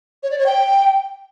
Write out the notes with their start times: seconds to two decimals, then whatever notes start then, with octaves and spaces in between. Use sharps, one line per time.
0.23 C#5
0.31 D5
0.38 C#5
0.46 G5